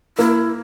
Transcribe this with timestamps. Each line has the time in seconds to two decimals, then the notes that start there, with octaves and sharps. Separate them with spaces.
0.18 A#3 E4